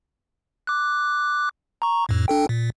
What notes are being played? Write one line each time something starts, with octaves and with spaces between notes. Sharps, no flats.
D6 F#6
A#5 C#6
F2 A2
D4 A4 G5
A#2